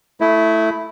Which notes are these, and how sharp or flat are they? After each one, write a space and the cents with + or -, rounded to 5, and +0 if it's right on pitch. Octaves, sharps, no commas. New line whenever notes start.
A3 +0 E4 +0 D#5 +35